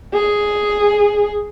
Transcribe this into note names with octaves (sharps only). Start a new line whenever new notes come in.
G#4